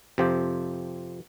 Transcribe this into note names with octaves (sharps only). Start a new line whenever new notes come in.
F2 C3 F3 C4 G4